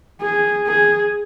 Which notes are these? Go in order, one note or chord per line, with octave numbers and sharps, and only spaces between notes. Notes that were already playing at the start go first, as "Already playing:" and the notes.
G#4
G#4